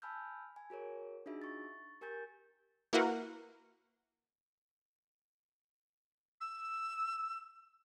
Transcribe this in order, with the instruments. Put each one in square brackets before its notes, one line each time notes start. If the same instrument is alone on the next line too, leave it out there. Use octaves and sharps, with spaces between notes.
[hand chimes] G#5 A5 B5 E6 F6 G6
G#5
F#4 G#4 A#4 C#5
D4 D#4 F4 F#4 G#4 E5
C#6 A6
G4 A#4 G#5 G6 A6
[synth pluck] A#3 E4 F#4 A#4 B4 F#5
[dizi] E6